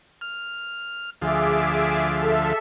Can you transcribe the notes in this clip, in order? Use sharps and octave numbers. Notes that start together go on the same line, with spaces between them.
F6
D2 F3 G#4 E5 D6
A4 E5